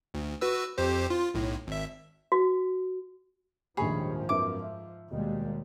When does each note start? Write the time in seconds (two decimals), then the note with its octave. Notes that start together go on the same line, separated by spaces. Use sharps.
0.14 D2
0.41 F#4 B4 E6
0.78 F2 G4 C5
1.10 F4
1.34 B1 A2
1.67 G#1 E5
2.32 F#4
3.77 A#1 D#2 G#2 F3 G3 G#4 C#5 B5
4.29 F#2 B3 E5 D6
4.62 E5
5.11 D#2 B2 G3 G#3